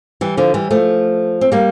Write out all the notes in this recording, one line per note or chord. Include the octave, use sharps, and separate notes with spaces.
E3 G3
D3 F3
E3 G3
F3 A3
C4
G3 A#3